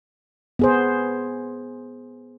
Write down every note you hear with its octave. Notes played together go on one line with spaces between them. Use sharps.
B3 G#4 C5